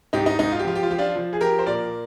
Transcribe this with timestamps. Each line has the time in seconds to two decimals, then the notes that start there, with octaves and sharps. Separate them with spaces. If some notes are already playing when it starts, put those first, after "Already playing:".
0.13 G#2 D#4 G4
0.26 D#4
0.39 G#2 D#4
0.52 F4
0.59 G4
0.64 F3 F4
0.75 G4
0.83 F4
0.90 F3 G4
0.98 D4 F4
1.16 F3
1.33 G#4
1.41 F3 G4 A#4
1.59 C5
1.66 A#2 A#4 D5